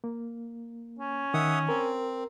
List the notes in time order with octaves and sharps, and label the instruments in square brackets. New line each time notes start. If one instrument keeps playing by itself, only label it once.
[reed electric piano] A#3
[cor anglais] C#4
[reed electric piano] D#3 [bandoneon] E5 F#5 D#6
[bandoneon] C4 [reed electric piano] A#4